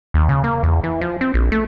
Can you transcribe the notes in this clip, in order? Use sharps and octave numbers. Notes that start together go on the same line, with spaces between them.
D#2
C#3
A#3
E2
E3
F3
C4
A#1
A3